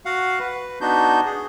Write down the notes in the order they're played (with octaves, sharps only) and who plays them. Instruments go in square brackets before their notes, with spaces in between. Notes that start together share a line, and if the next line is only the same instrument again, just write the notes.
[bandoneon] F#4 F5 F#5
B4
B3 D4 D#4 F#4 G6
G#4